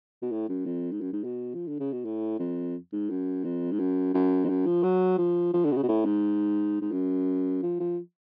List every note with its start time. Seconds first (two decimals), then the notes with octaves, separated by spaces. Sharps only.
0.22 B2
0.31 A2
0.49 F#2
0.66 F2
0.91 G#2
1.00 F#2
1.12 G#2
1.24 B2
1.54 F3
1.67 D3
1.79 C#3
1.92 B2
2.05 A2
2.39 F2
2.92 G#2
3.10 F#2
3.44 F2
3.72 G#2
3.79 F#2
4.14 F#2
4.44 F2
4.49 F#2
4.66 F3
4.83 F#3
5.18 F3
5.53 F3
5.65 D3
5.72 B2
5.76 C#3
5.83 B2
5.88 A2
6.05 G#2
6.81 G#2
6.92 F#2
7.62 F3
7.80 F3